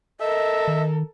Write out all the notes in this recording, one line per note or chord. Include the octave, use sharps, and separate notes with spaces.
A4 A#4 D#5 E5
D#3